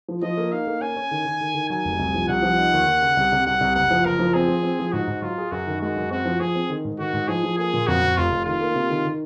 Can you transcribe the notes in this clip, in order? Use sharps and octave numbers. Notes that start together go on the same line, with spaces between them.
F3
F3 D#5
A#3
D#4 F5
A#3
C#4 G#5
C#4
D#3
D#3
D#3
D#3
F#3 G#5
F1
C2
F3
C2 F#5
F3
D#4
D#2
D#2
C#3
C2
C3
C2 F#5
C2
F#1 F#5
F3
F#1 A#4
F3
C4 G#4
F3
C4
F3
G#2 F#4
G#2
F#3 F4
G#4
F#2 F#4
D#3
G#3 F#4
F#2
C4 F#4
F3
F3 G#4
C4
D#3
G#2
D#3 F#4
G#2
F3 G#4
F3
A#3 G#4
A#2
F2 F#4
F2
F1 F4
F1
D#3 F4
A#3
C3
D#3
D#3